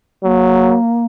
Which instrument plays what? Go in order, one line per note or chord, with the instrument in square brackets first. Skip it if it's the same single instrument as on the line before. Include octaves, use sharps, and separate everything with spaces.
[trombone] F#3 [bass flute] A#3